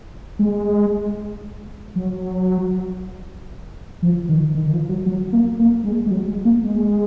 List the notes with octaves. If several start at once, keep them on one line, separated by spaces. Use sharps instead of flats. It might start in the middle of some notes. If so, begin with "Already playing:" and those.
G#3
F#3
F3
D#3
D#3
D#3
F3
F#3
F#3
A#3
A#3
G#3
G#3
F#3
G#3
A#3
G#3